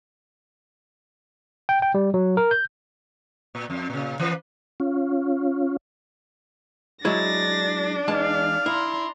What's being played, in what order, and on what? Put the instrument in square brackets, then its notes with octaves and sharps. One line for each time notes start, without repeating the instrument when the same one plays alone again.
[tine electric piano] G5
G5
G3
F#3
A#4
G6
[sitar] A#2
F2
A#2 C#3
E3 B4
[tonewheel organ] C#4 F4
[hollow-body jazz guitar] F#3 G#3 E4 [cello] D4 [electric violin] A6 A#6
[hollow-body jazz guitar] E2 G#3 A5 [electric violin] D#4 [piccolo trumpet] F5
[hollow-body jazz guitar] E4 [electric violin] A#5 C6